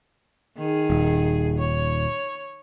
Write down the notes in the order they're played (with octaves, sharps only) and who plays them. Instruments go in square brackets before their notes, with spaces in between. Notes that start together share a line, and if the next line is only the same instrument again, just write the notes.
[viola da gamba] D#3 G#4
[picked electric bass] D#1
[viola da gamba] C#5